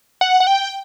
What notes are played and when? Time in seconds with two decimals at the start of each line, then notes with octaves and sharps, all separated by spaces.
0.21 F#5
0.40 F#5
0.47 G5